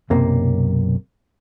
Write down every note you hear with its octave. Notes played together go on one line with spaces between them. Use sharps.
B1 F#2 C3 A#3